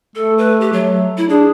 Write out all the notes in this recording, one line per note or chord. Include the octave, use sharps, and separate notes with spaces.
A3 A4
B4
G4
F#3
E4
D4 G#4